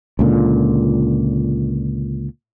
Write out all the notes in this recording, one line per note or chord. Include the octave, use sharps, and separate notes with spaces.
C#2 A#2 D3